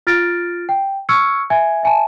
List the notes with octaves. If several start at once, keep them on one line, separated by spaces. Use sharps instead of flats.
F4 F6 A6 A#6 D7
G5
C#6 E6 F6 G#6 C#7
E5 G#5 G#6
E5 G#5 A5